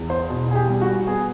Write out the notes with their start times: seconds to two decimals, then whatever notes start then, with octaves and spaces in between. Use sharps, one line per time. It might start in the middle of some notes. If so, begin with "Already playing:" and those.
Already playing: E2
0.10 C5
0.30 B2
0.51 G#4
0.55 G4
0.68 G3
0.81 F#4
1.07 B3 G#4